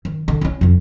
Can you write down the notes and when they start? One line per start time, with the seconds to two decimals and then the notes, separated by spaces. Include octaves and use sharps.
0.05 D#3
0.28 D3
0.41 C4 C#4
0.61 F2 F3